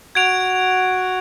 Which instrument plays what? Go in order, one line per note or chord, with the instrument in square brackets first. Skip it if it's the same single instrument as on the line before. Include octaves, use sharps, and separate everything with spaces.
[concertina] F#4 [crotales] G#6 D7 F7